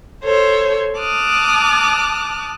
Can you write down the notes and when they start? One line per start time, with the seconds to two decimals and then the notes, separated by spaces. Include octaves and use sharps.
0.24 A4 C5 C#5
0.98 A5 D6 D#6 F6 F#6